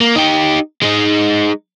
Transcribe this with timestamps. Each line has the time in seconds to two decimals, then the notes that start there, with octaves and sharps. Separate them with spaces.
0.01 A#3
0.15 D#4 G4
0.82 G#3 D#4